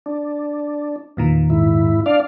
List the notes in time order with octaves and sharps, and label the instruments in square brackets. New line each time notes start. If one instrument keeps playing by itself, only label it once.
[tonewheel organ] D4
[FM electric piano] E2 A#2 D#3
[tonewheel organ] G#2 E4
D4 D5 F5